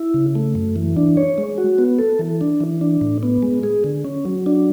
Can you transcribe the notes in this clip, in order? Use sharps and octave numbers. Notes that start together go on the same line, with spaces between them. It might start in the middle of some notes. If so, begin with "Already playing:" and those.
Already playing: E4
C#3
A3
F#2
E3
D4
C#5
G#3
F#4
B3
A4
E3
D4
E3
D4
A2
B3
G#3
G#4
D3
C#4
F#3
D4